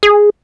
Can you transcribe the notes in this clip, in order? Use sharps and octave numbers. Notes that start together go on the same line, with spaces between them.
G#4